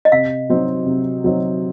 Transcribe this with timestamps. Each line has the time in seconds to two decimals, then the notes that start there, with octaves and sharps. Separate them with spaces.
0.05 D#5
0.12 C3 F5
0.50 F#3 C4 D#4
0.86 C3
1.24 F#3 C4 D#4